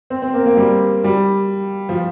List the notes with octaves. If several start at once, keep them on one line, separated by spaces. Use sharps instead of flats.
C4
C4
A#3
A#3
G3
G3
F3